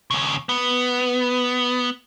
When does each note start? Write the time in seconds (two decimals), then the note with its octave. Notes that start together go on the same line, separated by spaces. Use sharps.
0.11 D#2 C#3
0.49 B3